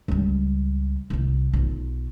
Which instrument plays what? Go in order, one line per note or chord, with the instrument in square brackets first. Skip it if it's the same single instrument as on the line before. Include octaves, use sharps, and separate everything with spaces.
[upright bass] C#2 G3
D#1 C2
B1 F4